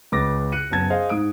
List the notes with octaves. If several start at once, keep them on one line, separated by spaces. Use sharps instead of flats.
C#2 C#3 B4 D6 A6 A#6
F#6 C#7 D#7
F#1 F#2 B3 A5 G#6
G#4 C5 D#5 F5
G#2 D#6 D7